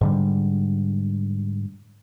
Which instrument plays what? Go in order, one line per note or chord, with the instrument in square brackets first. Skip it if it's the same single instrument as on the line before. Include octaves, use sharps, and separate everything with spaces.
[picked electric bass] G#2 D3 G3